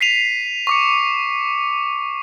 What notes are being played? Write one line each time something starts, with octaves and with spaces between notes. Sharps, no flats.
B6 C7 D#7 F7
C#6 D6 C#7